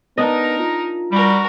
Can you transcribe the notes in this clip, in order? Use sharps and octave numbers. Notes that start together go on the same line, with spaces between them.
B3 D4 D#4 A#4 D#5
F4
G3 F#4 A#4